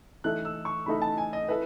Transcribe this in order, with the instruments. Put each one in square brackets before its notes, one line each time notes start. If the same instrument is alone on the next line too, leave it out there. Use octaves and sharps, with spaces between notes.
[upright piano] E3 A3 D#4 A4 E5 [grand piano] F#6
[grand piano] E6
C#6
[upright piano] E3 A3 D#4 A4 E5 [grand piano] B5
[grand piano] A5
G#5
D#5
[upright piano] E4 A4 E5 [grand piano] B4